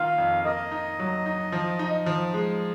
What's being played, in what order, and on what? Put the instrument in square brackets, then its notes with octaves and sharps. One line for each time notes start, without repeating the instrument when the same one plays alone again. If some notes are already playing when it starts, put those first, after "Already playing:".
Already playing: [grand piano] D#3 A#3 F4 [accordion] F5
[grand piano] F2
[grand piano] A#3 [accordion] D#5
[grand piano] D#4
F#3
D#4
F3
D#4
F3
G#3